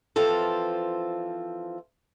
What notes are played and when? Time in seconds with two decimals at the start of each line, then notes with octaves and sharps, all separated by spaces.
0.16 E3 F3 C4 F4 A4